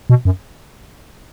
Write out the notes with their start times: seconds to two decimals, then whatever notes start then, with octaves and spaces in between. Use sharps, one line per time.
0.10 B2
0.25 F#2